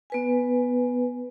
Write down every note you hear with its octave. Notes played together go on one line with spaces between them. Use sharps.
B3 B4 G#5